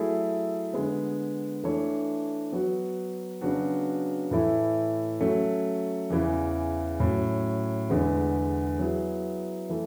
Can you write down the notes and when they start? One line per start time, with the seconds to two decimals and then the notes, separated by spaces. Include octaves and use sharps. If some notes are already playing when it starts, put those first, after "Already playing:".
Already playing: F#3 A3 E4 G#4
0.73 D3 G#3 B3
1.64 E3 A3 D4 A4 C#5
2.52 F#3 B3 F#4
3.41 C#3 F#3 B3 D4 F#4
4.31 A2 E3 A3 E4
5.21 F#3 A3 C#4
6.10 E2 C#3 E3
7.00 A2 F#3 C#4
7.90 E2 D3 G#3 B3
8.79 F#3 B3 E4 G#4
9.69 E3 A3